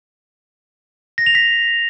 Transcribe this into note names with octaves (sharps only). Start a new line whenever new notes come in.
A#6
F7
B6